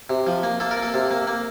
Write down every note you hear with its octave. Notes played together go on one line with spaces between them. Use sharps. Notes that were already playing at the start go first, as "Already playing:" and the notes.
C3
F3
A#3
A#3 A4
A#4
A#3
A4
C3
A#3
A#3